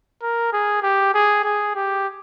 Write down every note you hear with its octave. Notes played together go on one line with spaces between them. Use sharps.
A#4
G#4
G4
G#4
G#4
G4